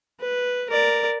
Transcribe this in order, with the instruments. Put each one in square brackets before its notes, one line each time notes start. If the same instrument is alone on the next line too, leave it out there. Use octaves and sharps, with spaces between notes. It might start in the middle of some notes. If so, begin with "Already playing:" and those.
[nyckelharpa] B4
A#4 D5